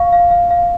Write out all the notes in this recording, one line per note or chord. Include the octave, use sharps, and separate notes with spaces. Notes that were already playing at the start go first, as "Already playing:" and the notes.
Already playing: F5 C#6
F5
F5
F5